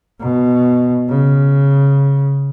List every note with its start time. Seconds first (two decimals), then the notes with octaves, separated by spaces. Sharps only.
0.20 B2
1.09 C#3